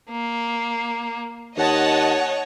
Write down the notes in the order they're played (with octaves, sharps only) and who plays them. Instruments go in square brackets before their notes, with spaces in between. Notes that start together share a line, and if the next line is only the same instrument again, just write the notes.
[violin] A#3
[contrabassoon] D#2 [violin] C#5 [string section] D#5 F#5 A5